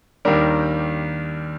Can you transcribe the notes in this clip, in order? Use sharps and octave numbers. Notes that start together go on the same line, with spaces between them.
D#2 D#3 G3 D4 A#4